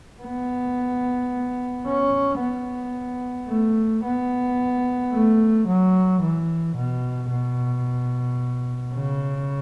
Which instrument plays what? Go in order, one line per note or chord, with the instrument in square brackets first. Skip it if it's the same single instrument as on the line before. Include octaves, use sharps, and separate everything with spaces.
[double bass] B3
C#4
B3
A3
B3
A3
F#3
E3
B2
B2
C#3